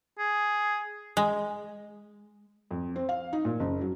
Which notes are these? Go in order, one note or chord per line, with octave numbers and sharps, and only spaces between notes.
G#4
G#3
F2
C4
F5
D#4
A#2
F#1
F#3